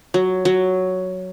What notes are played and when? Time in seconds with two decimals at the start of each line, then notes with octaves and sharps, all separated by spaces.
0.14 F#3
0.45 F#3